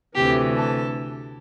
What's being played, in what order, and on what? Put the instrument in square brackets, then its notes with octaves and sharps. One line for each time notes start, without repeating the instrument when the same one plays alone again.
[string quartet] D2 C3 E3 G4
A4